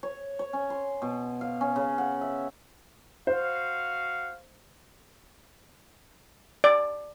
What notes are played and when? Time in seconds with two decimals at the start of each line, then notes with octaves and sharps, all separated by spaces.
0.03 C#5
0.39 C#5
0.53 C#4
0.70 C6
1.02 B2
1.41 F5
1.61 C#4
1.76 C#3
1.98 F#5
2.21 E5
3.27 F#4 C5 F5
6.64 D5